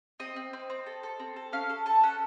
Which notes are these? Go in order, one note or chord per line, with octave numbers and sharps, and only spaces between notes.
C4 D#5
C4
C4
C4
A4
A4
C4
A4
C#4 F5
A4
A4 A5
C#4 F#5